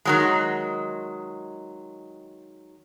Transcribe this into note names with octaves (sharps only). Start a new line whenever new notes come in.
D#3 F#3 G#3